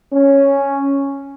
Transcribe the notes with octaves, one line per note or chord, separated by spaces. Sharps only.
C#4